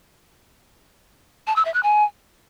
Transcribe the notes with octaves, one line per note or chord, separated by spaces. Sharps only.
A5
E6
E5
F#6
G#5